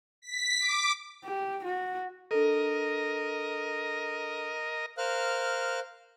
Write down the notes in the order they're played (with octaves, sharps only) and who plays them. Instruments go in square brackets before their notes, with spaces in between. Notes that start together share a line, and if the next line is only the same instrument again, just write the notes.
[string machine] B6
D6
[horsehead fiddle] G4
F#4
[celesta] D4 A4 [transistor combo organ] A#4 D#5
[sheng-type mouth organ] A#4 C5 F5 F6 F#6